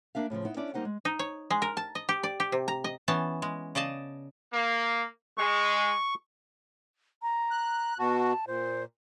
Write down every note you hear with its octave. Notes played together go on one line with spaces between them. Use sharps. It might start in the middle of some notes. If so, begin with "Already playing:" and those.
A#3 D4 E5 F5
A2 C#3 E3 F3
B3 D#4 E4
C#4 D4 E4 D5
G3 A#3 D#4 C5 F#5
G#3
D#4
C#5
G#3
A#4
A5
D#5
G4
D5
G4
C3
A#5
D#5
E3 B3 C#4 A5
G#3
C#3 D5 D#5 A5
A#3
G#3 C#6
A#5
F#6
B2 F#4 A5
A#2 C5